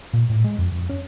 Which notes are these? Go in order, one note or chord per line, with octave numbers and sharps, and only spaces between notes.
A#2
A2
G#3
F2
F2
C#4